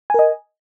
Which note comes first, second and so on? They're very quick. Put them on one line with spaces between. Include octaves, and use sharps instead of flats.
G#5 A#4 D#5